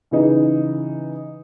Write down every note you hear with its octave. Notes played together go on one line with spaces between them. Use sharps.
C#3 E3 D#4